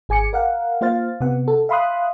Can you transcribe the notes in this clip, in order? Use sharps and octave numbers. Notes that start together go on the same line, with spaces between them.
G#1 G#4 G#5 D6 C#7
A#4 F5 F#5
A#3 F4 C5 F5 A6
C3 B3 F#5
A4
E5 F5 B5 C6 D#6 F#6